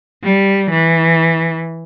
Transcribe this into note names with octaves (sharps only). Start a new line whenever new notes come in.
G3
E3